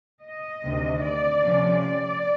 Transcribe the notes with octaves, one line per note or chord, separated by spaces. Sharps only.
D#5
D2 C3 D#3
D5
C3 F3 A3 C#4
D5